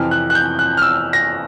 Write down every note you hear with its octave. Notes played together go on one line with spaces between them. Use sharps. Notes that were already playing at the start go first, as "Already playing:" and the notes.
Already playing: F2 C3 E3 F6
F#6
F#6
G6
F#6
F6
E6
A#6